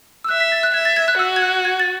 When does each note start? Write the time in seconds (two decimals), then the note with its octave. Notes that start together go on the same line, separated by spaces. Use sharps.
0.24 E6
0.29 E5 F#6
0.40 B6
0.52 A6
0.63 F#6
0.74 E5 G#6
0.85 A6
0.96 G#6
1.08 F#6
1.19 F#4 E6
1.36 G#6
1.42 F#6
1.65 G#6
1.80 A6